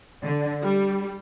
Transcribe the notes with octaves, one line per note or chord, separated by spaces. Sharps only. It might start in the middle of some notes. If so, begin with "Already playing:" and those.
D3
G3